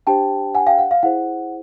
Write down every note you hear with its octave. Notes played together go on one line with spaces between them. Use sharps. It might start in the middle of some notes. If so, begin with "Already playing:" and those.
D4 G4 C5 G5 A5
F#5 G#5
F5 G5
F#5
F5
E4 G#4 C5 F#5